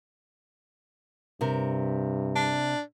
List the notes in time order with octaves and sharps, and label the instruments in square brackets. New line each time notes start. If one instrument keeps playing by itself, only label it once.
[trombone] G2 [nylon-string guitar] C3 A#4
[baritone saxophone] D4